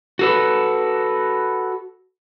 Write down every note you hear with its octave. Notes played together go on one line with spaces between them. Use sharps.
F#4 A4 B4